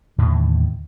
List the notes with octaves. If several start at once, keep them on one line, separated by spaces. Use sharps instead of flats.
D#2 A2 D3 D#3